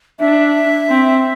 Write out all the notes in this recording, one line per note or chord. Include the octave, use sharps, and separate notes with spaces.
D4 E5
C4